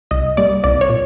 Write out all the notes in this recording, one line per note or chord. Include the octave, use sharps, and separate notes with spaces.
C2 D#5
A#2 G3 D5
C2 D5
C#5
A#2